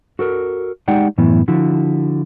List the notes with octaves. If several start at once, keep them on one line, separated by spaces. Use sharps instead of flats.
F#4 A4 A#4
G#3 D#4 G4 D5 F#5 G5
F#2 A2 E3 B3 E4
D3 F3 E4 F#4